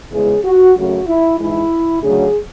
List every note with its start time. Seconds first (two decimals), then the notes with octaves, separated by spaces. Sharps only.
0.11 E2 C#3 E3 G#3 G#4
0.44 F#4
0.75 F#2 C#3 F#3 A3 F#4
1.06 E4
1.38 G#2 E3 G#3 E4
2.02 D2 C#3 F#3 A3 G#4